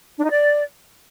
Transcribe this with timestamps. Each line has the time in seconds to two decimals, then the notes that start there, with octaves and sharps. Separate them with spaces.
0.18 D4
0.24 D#4
0.30 D5